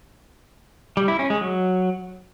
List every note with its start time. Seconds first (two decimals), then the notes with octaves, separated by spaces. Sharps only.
0.97 G3
1.08 E4
1.19 C#4
1.30 G#3
1.41 F#3